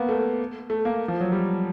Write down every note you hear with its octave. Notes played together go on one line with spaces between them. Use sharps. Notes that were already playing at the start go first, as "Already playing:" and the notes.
Already playing: A#3 B3
A3
A3
A#3
F3
F#3
G3